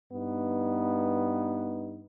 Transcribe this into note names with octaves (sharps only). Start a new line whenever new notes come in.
G2 B3 D#4